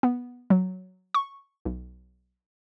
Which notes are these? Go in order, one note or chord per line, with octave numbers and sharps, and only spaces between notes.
B3
F#3
C#6
B1